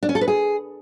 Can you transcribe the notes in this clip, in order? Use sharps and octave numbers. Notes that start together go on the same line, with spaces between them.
D4
C#4
A4
B4
G#4